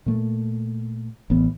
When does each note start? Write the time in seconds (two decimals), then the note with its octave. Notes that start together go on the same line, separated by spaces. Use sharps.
0.06 A#2 A3
1.30 A1 B3